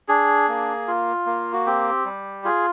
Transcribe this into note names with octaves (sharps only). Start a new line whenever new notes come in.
D4 G#4
A#3
F4
A#3
F#4
C4 G4
G3
F4 G#4